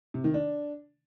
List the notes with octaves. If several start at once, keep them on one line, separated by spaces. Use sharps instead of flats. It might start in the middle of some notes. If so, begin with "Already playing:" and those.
C3
D#3
D4